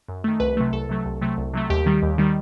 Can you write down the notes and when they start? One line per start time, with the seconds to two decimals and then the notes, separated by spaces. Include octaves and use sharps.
0.08 F#2
0.24 D#3 A3
0.40 C2 B4
0.57 C3 F#3 A3
0.73 C2 A4
0.89 C3 F#3 A3
1.06 C2
1.21 C3 F#3 A3
1.38 C2
1.54 C3 F#3 A3
1.70 D#2 G4
1.86 D#3 G3
2.03 D#2
2.18 D#3 G3